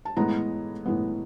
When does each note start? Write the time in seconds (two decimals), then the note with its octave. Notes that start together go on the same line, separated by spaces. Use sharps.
0.05 A5
0.16 A2 E3 G#3 B3 A#5
0.86 A2 E3 G#3 B3